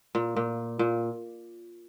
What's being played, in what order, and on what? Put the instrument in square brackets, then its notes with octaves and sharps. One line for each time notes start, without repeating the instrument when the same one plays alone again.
[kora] A#2
A#2
A#2